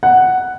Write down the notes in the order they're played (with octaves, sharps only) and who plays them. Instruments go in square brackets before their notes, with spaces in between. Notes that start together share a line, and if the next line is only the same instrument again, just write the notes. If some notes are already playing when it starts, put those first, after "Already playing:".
[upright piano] F#5